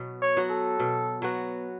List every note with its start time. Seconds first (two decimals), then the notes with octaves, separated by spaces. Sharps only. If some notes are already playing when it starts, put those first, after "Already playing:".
Already playing: B2 F#3 B3 F#4
0.22 C#5
0.37 F#3 B3 F#4
0.50 A4
0.80 B2
1.22 F#3 B3 F#4